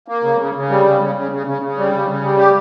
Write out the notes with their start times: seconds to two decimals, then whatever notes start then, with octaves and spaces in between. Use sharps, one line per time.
0.08 A#3
0.23 C#3
0.39 C#3
0.55 C#3
0.70 G3
0.85 C#3
1.00 C#3
1.16 C#3
1.31 C#3
1.47 C#3
1.62 C#3
1.77 G3
1.93 C#3
2.08 C#3
2.23 G3
2.38 G4